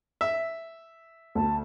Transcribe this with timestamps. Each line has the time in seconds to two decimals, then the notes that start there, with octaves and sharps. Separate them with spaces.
0.21 E5
1.35 D2 A5